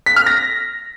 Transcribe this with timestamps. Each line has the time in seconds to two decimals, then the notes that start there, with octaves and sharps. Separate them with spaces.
0.06 B6
0.16 F6
0.26 A#6